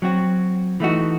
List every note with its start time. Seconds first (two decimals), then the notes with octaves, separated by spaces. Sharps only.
0.02 F#3 C4 F#4
0.80 E3 A3 D#4 F#4